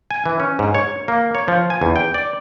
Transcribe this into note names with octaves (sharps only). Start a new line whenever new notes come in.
G#5
E3
C#4
G#2
C#5
A#3
C#5
F3
G#5
E2
G5
D5